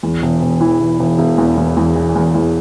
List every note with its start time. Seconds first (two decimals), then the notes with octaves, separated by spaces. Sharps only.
0.03 E2
0.22 E1
0.42 E1
0.61 E3
0.80 E1
0.99 E1
1.18 E1
1.38 E2
1.57 E2
1.77 E2
1.96 E3
2.15 E2
2.34 E2